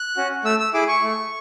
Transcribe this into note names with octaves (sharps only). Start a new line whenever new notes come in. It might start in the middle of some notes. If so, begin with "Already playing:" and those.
Already playing: F#6
C#4 F#4
A3 E6
E6
E4 G#4 D6
C#6
A3